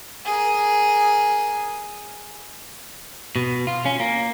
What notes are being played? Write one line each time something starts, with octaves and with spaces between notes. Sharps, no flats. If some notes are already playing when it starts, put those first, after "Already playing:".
G#4 A#4
B2
F4
C#4
A#3